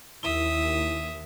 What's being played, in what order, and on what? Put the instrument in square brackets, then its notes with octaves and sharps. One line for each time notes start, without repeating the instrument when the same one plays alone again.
[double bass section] D#2 [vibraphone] E4 [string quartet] E5 D#6